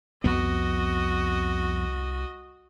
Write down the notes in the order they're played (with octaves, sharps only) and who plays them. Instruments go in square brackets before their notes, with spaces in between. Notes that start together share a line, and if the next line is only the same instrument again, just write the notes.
[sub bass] C2 [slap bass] F2 B3 [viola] F#4 D#5